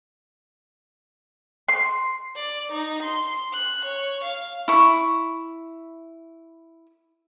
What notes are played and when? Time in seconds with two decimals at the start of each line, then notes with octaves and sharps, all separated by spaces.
1.69 C6
2.35 D5
2.71 D#4
3.02 C6
3.52 F#6
3.84 C#5
4.24 F5
4.68 E4 C#6